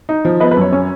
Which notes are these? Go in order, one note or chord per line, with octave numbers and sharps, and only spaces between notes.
D#4
F3
B3 B4 D#5
B4
F#2 C#5
C#4 C#5